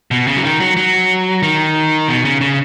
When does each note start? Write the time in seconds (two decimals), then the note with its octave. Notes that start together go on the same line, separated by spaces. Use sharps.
0.11 B2
0.28 C#3
0.37 F#3
0.44 D#3
0.60 F#3
0.77 F#3
1.43 D#3
2.08 B2
2.25 C#3
2.41 C#3